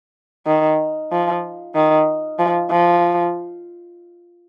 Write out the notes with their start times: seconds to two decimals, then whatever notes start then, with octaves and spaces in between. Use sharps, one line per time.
0.47 D#3
1.12 F3
1.75 D#3
2.39 F3
2.71 F3